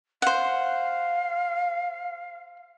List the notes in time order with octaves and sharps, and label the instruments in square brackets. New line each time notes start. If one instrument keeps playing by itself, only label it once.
[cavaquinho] C5 F#5 [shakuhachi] F5